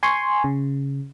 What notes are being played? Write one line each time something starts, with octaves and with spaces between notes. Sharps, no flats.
G#5 C6 C#6
C#3